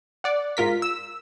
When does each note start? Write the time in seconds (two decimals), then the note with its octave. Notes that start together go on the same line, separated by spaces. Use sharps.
0.24 D5 F#5
0.57 G#2 F4 A#4 B6
0.82 E6